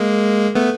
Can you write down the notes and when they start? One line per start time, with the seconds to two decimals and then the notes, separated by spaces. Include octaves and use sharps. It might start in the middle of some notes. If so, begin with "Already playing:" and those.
Already playing: G#3 A#3
0.55 A3 B3